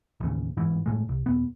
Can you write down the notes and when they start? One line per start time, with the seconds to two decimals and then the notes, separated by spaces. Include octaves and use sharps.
0.20 A1 D#2 C#3
0.57 G1 G#2 E3
0.86 G1 E2 A2 G#3
1.09 C2
1.26 D#1 B3